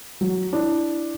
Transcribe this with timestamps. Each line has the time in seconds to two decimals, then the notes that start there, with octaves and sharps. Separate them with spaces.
0.21 F#3
0.53 D4 E4